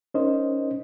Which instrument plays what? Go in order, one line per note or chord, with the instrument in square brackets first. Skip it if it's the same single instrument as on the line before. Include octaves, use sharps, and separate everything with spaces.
[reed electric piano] C#4 D#4 A#4 C5 D#5